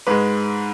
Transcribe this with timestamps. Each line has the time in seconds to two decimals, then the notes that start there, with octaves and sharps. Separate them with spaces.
0.07 G#2 G#3 B4